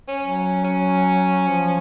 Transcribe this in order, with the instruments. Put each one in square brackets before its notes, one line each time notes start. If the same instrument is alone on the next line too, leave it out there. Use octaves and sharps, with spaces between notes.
[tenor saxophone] C#4
[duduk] F#3
[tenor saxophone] C#4
[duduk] F3